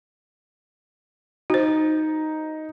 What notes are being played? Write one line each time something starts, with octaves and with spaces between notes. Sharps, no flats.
D#4 F#4 C5